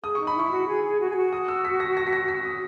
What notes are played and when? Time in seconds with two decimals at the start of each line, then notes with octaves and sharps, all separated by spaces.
0.04 G#4 D#6
0.15 D#4 C#6
0.27 B5
0.36 E4 C#6
0.51 F#4
0.68 G#4
0.84 G#4
1.00 F#4
1.10 G#4
1.16 F#4
1.33 D#6
1.48 E6
1.65 B6
1.80 A#6
1.97 A#6
2.07 B6
2.13 A#6
2.28 B6
2.45 D#6